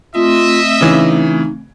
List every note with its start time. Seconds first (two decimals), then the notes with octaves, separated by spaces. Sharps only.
0.15 A3 C4 F4 D#5 E5
0.81 C#3 E3 D#4